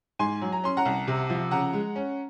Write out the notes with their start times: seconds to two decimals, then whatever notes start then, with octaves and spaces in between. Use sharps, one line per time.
0.19 G#2 G#5 C6
0.42 F#3
0.52 A#5
0.64 C#4 C6
0.77 F#5 A#5
0.86 C2
1.08 C3
1.30 F3
1.51 C#3 F#5 A#5
1.73 G#3
1.96 C#4